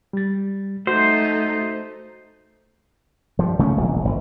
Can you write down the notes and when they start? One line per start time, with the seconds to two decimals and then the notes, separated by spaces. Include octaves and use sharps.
0.13 G3 A6
0.87 A3 D#4 F#4 C5
3.39 G2 F3
3.59 C#3 A3 B3 C#4
3.77 E1 A#1 F#3
4.05 F#1